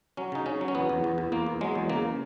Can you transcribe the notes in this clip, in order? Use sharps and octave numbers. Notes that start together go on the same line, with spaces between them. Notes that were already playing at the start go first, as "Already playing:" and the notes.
F#3 C#4
C#3 D#4
C#3 C#4
F#3
C#4
E2 B3
E2
E2
E2
E2 A#3
E2
F#3 G#3
E2
C#3 A#3